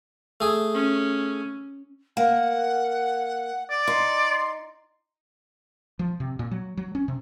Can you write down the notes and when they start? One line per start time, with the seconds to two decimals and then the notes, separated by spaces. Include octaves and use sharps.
0.40 A3 G#4
0.74 C#4
2.17 A#3 F#5
3.70 D5 D6
3.87 D#4 C6
5.99 F3
6.20 C3
6.39 A#2
6.51 F#3
6.77 F#3
6.95 C#4
7.08 C3